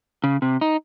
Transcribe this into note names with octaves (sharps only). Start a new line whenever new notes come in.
C#3
C3
D#4